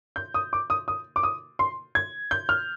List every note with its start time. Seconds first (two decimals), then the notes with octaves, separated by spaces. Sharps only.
0.16 G6
0.34 D#6
0.53 D6
0.70 D#6
0.88 D#6
1.16 D6
1.23 D#6
1.59 C6
1.95 G#6
2.31 G6
2.49 F6